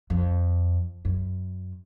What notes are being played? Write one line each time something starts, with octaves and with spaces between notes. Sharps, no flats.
F2
F#2